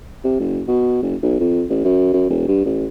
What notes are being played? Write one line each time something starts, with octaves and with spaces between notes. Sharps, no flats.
C3
F#1
B2
F#1
B1
F2
A1
F#2
F#2
E1
G2
A1